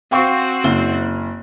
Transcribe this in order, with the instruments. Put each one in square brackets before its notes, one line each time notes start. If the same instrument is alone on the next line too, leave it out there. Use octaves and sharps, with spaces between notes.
[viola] C4 F#4 [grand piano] F5 G5 C#6
[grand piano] F#1 E4 G7